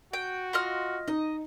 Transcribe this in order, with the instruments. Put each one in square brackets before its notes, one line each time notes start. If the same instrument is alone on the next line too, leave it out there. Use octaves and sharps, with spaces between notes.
[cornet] F#4 [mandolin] G5
[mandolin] F4 D#5 F6
[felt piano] D#4 [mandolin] D#5